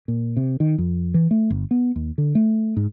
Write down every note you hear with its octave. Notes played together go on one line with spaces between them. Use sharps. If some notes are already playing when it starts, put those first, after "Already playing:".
A#2
C3
D#3
F2
E3
A3
G1
B3
D#2
D3
A3
G#2